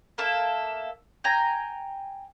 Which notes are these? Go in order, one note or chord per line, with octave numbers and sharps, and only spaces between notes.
A#3 A4 E5
G5 G#5 A#5